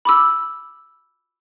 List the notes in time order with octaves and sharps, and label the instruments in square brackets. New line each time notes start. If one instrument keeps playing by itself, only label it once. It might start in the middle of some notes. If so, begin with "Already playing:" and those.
[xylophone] B5 D6 E6